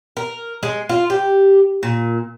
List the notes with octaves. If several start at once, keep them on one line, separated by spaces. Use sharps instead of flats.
A#4
G#3
F4
G4
A#2